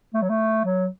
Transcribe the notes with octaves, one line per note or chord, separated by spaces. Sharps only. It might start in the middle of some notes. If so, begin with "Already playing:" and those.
A3
F#3
A3
F#3